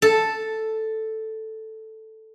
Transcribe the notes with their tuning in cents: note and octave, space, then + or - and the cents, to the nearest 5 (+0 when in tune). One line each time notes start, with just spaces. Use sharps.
A4 +0 A5 +0